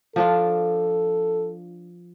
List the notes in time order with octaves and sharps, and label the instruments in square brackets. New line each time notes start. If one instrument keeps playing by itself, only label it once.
[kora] F3 D4 F4 [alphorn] A4